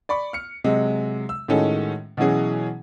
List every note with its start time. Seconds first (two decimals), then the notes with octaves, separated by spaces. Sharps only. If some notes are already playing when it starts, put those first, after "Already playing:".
0.09 D5 B5 C#6
0.33 F6 C#7
0.64 C3 F#3 G#3
1.29 E6
1.48 A2 D#3 G#3 C#4 F#4 A4
2.17 B2 E3 F#3 C#4 G#4